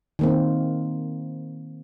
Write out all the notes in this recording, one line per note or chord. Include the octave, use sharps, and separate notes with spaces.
D#3 A#3 C4